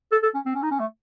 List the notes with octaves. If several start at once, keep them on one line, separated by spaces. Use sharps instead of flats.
A4
A4
C#4
C4
C#4
D#4
C#4
A3